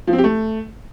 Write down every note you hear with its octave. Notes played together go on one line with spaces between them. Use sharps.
F3
C4
G4
A3